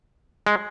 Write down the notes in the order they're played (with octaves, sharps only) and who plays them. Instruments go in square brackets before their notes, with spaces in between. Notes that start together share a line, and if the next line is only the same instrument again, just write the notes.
[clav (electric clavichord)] G#3